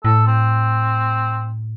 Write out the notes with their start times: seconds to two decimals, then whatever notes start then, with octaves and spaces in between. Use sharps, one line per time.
0.05 A2 A4
0.27 C4